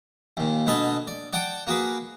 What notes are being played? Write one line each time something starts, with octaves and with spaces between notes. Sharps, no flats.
D#2 A#2
B2 D3 B4 D#5 G#5 A5
D5
D5 F#5 G5 A5 D6
A#3 F#4 G#4 B4